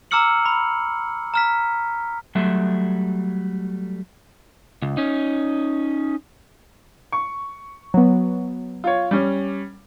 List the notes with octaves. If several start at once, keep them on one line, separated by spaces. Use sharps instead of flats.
A#5 D6 E6 F6 C#7 F#7
B5
A#5 F6 B6
F#3 G3 A3 E5
C#2
C#4 D#4
C#6
F#3 B3
F4 C#5
G3 C#4